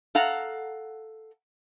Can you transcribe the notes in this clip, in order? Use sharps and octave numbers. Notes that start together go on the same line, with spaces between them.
A4 F5 F#5 A#5